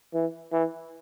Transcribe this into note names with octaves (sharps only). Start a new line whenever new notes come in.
E3
E3